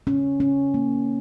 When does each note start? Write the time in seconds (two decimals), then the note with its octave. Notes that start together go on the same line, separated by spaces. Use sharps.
0.07 C#4
0.40 C#4
0.74 A#3